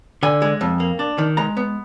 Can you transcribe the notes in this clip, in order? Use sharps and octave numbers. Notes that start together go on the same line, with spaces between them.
D3 G#5
G#3
F2
A#3
D4
D#3
G#3 A#5
B3